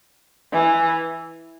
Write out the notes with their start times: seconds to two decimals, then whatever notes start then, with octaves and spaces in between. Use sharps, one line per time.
0.52 E3